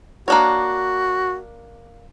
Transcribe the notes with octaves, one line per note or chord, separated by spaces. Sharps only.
A#3 D4 F#4 C#5